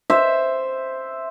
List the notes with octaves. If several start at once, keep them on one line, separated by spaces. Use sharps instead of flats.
C5 E5